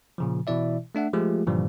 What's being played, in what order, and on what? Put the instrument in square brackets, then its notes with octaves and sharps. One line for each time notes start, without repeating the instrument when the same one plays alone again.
[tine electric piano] A#2 C#3 F3
B2 E3 E4 D5 E5
A3 D4 E5 F#5
F3 G#3 A3 F4 G4 G#4
G2 A#2 D3 E3 F3 G3